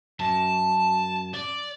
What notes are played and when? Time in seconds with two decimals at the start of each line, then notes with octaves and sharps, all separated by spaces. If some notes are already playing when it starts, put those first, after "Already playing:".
0.20 F#2 A5
1.34 D5